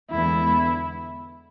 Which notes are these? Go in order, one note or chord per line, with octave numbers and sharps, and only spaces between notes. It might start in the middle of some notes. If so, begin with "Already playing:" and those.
E2 D3 G#3 B3 E4